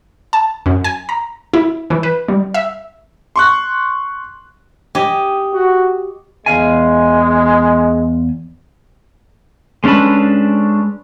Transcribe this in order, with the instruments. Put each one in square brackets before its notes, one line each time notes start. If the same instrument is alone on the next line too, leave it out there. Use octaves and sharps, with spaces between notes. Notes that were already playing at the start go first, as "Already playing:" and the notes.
[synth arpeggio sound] A5
F#2
G#5
A#5
E4
E3
B4
G3
E5
[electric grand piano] C6 C#6 F#6
[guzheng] G4 D#5 G#5
[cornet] F#4
[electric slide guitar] E2 F5 G#5 [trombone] G#3
[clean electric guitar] G#3 C#4 D4 A4 B4